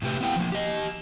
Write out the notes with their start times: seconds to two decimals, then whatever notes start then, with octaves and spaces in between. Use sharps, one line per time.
0.02 A2 C3 G4 B4
0.21 B3 E4 G5
0.36 F3 A#3
0.52 G4 D#5